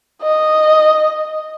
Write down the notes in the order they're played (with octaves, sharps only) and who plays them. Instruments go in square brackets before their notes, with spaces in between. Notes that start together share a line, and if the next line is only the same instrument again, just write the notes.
[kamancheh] D#5